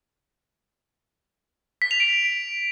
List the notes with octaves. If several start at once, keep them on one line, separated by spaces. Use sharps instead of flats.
B6
F7
D7